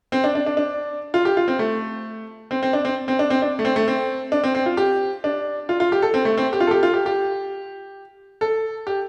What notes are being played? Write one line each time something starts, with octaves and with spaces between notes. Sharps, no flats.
C4
D4
D4
D4
D4
F4
G4
F4
C4
A3
C4
C4
D4
C4
C4
D4
C4
D4
A3
C4
A3
C4
D4
C4
C4
F4
G4
D4
F4
F4
G4
A4
C4
A3
C4
G4
F4
A4
G4
F4
G4
G4
A4
G4